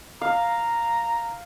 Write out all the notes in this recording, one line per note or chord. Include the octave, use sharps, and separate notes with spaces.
F5 A#5